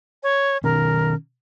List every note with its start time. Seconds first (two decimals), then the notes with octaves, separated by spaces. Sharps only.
0.23 C#5
0.64 B2 D#3 C#4 A#4